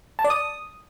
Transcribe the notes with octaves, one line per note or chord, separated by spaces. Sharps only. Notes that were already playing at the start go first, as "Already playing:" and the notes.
A5
D5
D#6